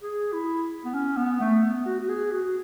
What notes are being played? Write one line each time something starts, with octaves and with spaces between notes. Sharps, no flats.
G#4
E4
B3
C#4
B3
A3
B3
F#4
F#4
G#4
F#4